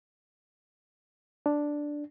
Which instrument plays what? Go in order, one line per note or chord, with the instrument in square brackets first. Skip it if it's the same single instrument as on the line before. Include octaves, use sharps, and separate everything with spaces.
[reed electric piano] D4